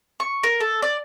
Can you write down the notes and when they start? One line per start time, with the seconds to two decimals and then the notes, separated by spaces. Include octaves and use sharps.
0.20 C#6
0.43 A#4
0.60 A4
0.82 D5